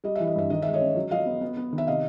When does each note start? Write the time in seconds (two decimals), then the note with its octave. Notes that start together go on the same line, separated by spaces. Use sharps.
0.04 G3 D#5
0.15 E3 E5
0.27 D#5
0.35 G2 E5
0.50 D#3 D#5
0.62 G#3 E5
0.73 C#5 D#5
0.81 C#4
0.96 F#3
1.11 F#3 D#5 F5
1.26 B3
1.41 B3
1.57 B3
1.73 D#3
1.78 E5
1.87 C3 D#5 F5